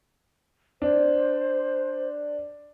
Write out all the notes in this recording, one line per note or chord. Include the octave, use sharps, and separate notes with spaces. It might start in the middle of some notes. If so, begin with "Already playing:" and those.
D4 C5